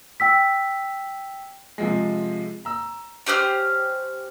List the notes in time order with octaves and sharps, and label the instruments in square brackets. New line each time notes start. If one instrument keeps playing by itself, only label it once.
[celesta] G5 E6 B6
[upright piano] C3 F3 G#3
A#5 E6
[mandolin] C#4 G4 C5 F6